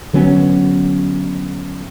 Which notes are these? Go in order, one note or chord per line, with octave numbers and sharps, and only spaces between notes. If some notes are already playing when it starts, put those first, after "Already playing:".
D3 F#3 B3 C#4